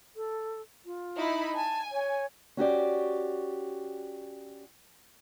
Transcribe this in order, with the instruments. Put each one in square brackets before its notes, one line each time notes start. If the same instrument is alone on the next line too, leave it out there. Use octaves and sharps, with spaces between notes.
[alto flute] A4
F4
[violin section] D#4 E4 B5
[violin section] G#5 [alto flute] A5
[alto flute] C#5
[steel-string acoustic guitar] C#4 F#4 G4 D5